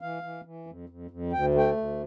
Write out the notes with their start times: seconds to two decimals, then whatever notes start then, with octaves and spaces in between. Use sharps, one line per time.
0.01 E3 F5
0.23 E3
0.45 E3
0.67 F2
0.89 F2
1.11 F2
1.33 D2 G5
1.54 A3 G5
1.77 D2